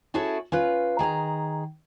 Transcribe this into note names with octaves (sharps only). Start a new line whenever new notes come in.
C#4 E4 F#4 G#4 A4 C#5
C#4 F4 B4
D#3 G#4 A5 A#5